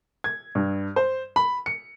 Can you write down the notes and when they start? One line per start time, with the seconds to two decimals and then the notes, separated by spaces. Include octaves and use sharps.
0.24 G#6
0.55 G2
0.96 C5
1.36 B5
1.66 C#7